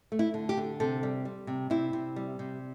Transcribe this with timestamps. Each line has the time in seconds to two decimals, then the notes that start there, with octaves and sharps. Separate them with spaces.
0.12 A3
0.19 E4
0.34 D3
0.49 G4
0.57 D3
0.80 C3 A4
1.03 G3
1.25 G3
1.47 C3
1.70 C3 E4
1.93 C3
2.16 G3
2.39 C3